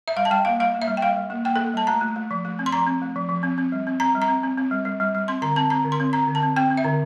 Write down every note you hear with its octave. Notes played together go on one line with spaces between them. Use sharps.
E5
G3 F5
A5
G3 G5
A#3 F5
G3 F5
A#3
E5
G3
G5
G3 F5
G3
A#3
A#3 G5
A#3 A4
G3 A5
A3 A#5
A3
A3
F3
A3
C4
C6
F3 A#5
C4
A3
F3
F3
C4
C4
G3
C4
C4 A#5
G3
A#5
C4
C4
C4
G3
G3
G3
G3
C4 C6
D3 A#5
C4 A5
C4 A#5
D3
C6
C4
C4 A#5
D3
A5
C4
C4 G5
C4
E5
D3